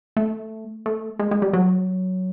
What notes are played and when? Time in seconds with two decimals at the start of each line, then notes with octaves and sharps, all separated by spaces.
0.17 A3
0.86 A3
1.19 G#3
1.31 G#3
1.42 G3
1.53 F#3